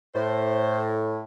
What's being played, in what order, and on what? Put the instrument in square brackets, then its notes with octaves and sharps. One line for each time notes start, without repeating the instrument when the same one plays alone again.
[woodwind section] A2 [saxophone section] C5